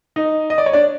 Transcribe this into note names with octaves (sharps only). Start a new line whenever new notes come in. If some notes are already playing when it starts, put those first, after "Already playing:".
D#4 D#5
D#5
D5
C#5
D4 D5